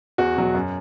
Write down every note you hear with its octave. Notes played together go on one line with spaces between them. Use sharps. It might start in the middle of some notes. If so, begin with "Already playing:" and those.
E2 F#4
B2 F#3
F#2